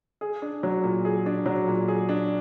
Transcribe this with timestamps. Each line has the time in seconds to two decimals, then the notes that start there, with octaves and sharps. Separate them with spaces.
0.21 G#4
0.42 D4
0.63 F#3
0.84 A#2
1.05 G#4
1.26 D4
1.46 F#3
1.68 A#2
1.88 G#4
2.09 D4